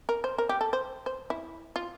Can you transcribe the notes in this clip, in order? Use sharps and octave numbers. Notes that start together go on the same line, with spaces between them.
A#4
C5
A#4
G4
A4
C5
C5
E4
F4